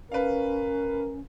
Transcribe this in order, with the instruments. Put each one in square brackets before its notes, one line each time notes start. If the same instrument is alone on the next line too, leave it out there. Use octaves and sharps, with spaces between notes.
[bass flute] C#4 [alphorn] A#4 [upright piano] B4 F5